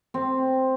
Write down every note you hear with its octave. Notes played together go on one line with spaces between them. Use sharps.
C4